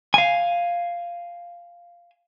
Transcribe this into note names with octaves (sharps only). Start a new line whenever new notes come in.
F5 G#5